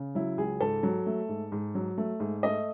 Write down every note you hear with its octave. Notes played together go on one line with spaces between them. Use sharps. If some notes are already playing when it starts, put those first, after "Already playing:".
Already playing: C#3
F#3 E4
C#2 G#4
G#2 A4
F#3
A3
G#2
G#2
F#3
A3
G#2
A3 D#5